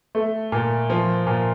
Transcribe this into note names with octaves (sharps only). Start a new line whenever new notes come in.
A3
A#2
F3
A#2